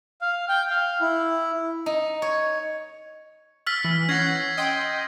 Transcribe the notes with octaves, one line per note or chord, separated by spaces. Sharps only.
F5
G5
F5
E4
D#4
C#5
E6 F6 A6 B6
E3
C#4 F#5 G#6 A#6 C7
D#5 G5 C6